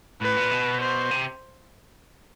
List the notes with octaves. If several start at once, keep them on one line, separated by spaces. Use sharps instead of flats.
A2 B4
A#2
B2
C5
C3